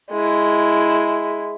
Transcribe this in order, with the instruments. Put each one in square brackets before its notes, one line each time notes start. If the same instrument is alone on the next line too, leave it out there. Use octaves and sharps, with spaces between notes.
[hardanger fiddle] G#3 E4